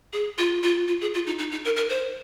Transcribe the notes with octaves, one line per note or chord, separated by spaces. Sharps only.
G#4
F4
F4
F4
G#4
F4
D#4
D#4
D#4
A#4
A#4
C5